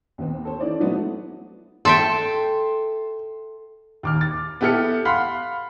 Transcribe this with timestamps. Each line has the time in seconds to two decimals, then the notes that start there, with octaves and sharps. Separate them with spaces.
0.18 D#2 B3 C4
0.45 A4 C5 C#5
0.60 E3 C#4 D#4 E4 D5
0.80 F#3 G#3 A3 B3 C4 D#4
1.85 A4 E5 G5 C6
4.03 D#2 D6 F6
4.21 A6
4.61 B3 E4 G4 A4 F6 C#7
5.05 F5 F#5 B5 C6 F6 B6